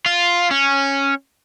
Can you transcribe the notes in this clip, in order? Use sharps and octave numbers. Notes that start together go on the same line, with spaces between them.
F4
C#4